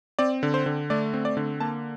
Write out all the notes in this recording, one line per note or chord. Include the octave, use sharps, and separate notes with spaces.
C4 D5
D3
C5
D3
A3 D5
C4
D5
D3
A#3 A5